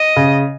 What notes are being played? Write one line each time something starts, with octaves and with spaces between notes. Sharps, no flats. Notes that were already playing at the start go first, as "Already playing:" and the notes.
Already playing: D#5
C#3